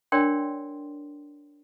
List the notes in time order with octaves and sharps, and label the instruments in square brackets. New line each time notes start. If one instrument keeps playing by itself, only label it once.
[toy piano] D4 A#4 C#5 D5 G5 C6